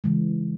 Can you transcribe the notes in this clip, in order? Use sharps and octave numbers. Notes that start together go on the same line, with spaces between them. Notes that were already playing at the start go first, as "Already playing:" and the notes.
C#3 E3 G#3